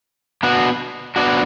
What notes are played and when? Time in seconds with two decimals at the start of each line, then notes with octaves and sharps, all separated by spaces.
0.43 B3 D4 F#4
1.16 B3 D4 F#4